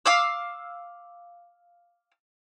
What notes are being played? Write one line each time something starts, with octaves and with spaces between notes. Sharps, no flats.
F5 D6 E6